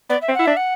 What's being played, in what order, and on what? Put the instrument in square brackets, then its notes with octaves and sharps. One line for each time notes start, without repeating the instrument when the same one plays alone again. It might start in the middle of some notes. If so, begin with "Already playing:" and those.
[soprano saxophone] B3 [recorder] D5
[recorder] E5
[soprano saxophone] C4
[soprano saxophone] E4 [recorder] F#5
[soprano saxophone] D4 [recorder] E5
[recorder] F#5